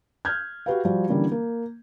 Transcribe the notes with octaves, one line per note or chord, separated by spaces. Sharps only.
F6 G6 G#6
F#4 G4 B4 F5
F3 G3 F#4
D3 E3 G3 A#3 C#4
A#3